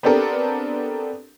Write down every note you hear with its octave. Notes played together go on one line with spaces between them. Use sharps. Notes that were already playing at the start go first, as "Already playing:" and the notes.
B3 C4 D4 G4 A4 A#4